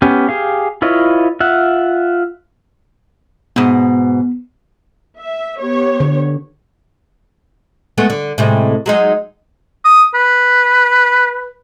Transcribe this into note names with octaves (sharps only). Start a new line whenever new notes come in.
B3 C#4 G4 G#5
G4 G#4 F5
E4 F4 B4 C#5 D#5
F4 E5 F#5
G#2 B2 B3
E5
B3 G4 C#5
D3
G#3 A3 B3
D3
A2 C3 G#3
F#3 G#3 D#4
D#6
B4